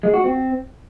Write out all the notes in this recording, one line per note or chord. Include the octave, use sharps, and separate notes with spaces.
G#3
F#4
C4